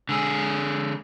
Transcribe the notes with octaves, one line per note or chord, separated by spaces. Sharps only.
D3 G#3 G#4 E6